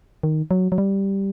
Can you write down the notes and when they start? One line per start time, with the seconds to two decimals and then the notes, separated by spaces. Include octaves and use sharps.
0.23 D#3
0.51 F#3
0.72 F#3
0.78 G3